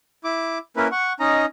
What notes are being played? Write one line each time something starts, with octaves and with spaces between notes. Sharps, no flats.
E4 D6
A#3 C#4 E4 A#4 B4
F#5 C#6
C#4 D#4 D#5 A#5